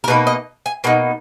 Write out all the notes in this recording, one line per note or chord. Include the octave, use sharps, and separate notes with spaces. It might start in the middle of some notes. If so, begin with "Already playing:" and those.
A#4
B2 A#3 D#4 B4
D#5
G#5
B2 A#3 D#4 F#5